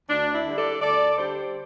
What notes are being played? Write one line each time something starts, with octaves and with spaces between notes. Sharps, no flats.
D2 D4
E4
D3 G3 D4
A4 D5
D2 A4 D5
D3 G3 D4 G4 C5